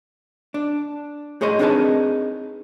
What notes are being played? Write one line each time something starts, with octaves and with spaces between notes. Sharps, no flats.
D4
A2 G#4 C#5 D#5 C6
C4 D4 D#4 G#4 B4 A5